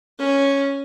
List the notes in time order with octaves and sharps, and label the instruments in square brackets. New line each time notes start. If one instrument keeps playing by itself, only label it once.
[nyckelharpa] C#4